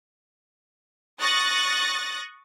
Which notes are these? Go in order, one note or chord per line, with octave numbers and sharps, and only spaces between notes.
C#6 D#6 F#6 A6 A#6